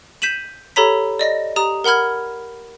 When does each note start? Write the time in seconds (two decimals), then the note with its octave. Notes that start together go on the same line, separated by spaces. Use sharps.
0.22 G6 B6 D#7 E7 F#7
0.76 G4 A4 C#5 A#5 B5 B6
1.19 D5 D#5 A#6
1.56 G4 A#5 D#6
1.84 A#4 F#5 B5 F6 G#6